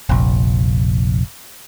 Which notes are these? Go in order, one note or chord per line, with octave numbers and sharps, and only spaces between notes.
F1 A#1